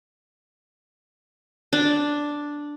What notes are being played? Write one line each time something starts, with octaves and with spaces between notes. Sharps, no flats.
D4